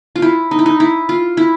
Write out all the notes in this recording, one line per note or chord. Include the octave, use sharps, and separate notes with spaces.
F4
E4
D#4
E4
D#4
E4
F4
E4